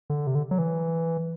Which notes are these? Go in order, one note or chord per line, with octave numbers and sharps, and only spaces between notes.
D3
C3
D3
F#3
E3